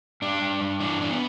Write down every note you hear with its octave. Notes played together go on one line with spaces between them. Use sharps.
G2 D4
G2
G2
E3 D4
E3 D4
B3